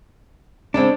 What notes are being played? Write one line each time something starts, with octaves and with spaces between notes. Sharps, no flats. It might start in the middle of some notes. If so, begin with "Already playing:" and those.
C#3 G#3 C4 D4